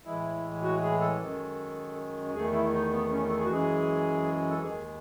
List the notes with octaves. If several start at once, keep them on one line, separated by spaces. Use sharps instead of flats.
A2 E3 G#3 E4
F#4
G#4
A4
F#2 D#3 G#3
E2 D#3 A3 G#4
E4
D#4
B3
C#4
A4
G#4
F#4
F#2 E3 G#3 G#4
A4
D#2 D#3 G#3 G#4